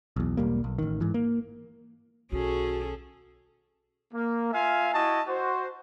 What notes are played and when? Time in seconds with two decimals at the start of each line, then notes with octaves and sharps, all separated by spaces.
0.16 B1 E2
0.37 E1 B1 G3 A#3
0.64 B1
0.79 A1 D#3
1.01 G#2 E3
1.14 A#3
2.32 B1 D#3 C#4 F#4 G#4 A4
4.14 A#3
4.52 F4 E5 F5 G#5
4.93 E4 F#4 D#5 A5
5.27 F#4 C5